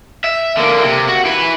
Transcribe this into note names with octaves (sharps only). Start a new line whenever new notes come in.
E5
D3 A#3
C3
F#4
E4 B4